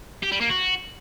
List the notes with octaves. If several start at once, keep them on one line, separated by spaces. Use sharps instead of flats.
G4
G3
A#3
F#4